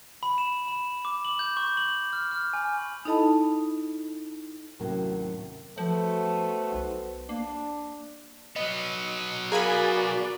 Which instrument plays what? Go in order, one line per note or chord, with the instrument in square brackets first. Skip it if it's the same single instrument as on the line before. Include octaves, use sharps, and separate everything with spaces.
[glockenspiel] B5
E7
B5
D6
F#7
G6
C#6
F#7
F6
F6
G#5
[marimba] D#4 E4 A4 D#5 A5 B5
[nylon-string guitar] D#2 A2 C3 F#3 C#4 A#4
[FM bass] F3 [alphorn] A3 [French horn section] B3 F#4 C5
[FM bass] B1
[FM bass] A#3 [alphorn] D4
[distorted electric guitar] F#3 B3 [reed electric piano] D#5
[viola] F#4 D5 [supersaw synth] G#4 G#5 B5 [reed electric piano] A#4 F5 A#5